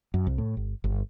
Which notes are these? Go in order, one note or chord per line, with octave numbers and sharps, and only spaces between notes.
F#2
C2
A2
G1
G1